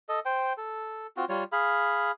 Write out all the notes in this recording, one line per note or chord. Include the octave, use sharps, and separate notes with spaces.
A4 D#5
C5 G5
A4
C4 F4 F#4
G3 F4 C#5
G#4 F5 B5